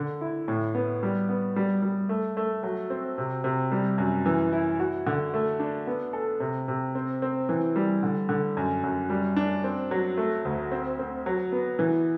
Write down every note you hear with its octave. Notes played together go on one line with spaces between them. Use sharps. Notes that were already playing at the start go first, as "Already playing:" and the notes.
Already playing: D3
E4
A2
B3
G3
B3
G3
G3
A3
A3
F#3
C4
C3
C3
G3
F#2
E3
E4
F#4
D3
A3
D4
B3
A4
C3
C3
C4
C4
E3
G3
D3
D3
F#2
F#2
G3
D4
C4
F#3
A3
D2
C4
C4
F#3
B3
E3